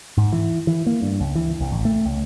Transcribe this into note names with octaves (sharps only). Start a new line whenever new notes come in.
G#2
E3
E3
A#3
G2
C#2
E3
C2
A1
A3
C#2